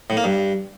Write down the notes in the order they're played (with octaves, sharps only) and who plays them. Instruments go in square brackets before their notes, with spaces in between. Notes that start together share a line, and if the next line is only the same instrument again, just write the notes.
[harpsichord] A2
A#3
G2